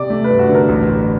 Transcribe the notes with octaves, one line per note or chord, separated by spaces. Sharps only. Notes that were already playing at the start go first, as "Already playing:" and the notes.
Already playing: C3 D5
A3
B4
G2
F#4
D3
A#4
A1
A1